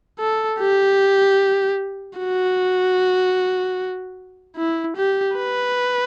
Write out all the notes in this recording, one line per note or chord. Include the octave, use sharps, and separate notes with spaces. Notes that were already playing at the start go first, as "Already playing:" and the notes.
A4
G4
F#4
E4
G4
B4